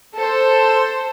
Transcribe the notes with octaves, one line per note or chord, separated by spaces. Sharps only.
A4 C5